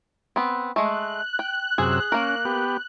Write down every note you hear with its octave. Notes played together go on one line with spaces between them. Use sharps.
B3 C4
G#3 A3 F#6
G5
F#2 C3 G#4 E6
A#3 C#4 A#4
B3 G4